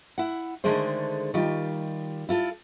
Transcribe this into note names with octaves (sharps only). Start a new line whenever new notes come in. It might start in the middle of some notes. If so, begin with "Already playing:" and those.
E4 F#5
D3 D#3 G#3 A3 G#4 C5
D#3 G3 F4 G4
E4 F4 A4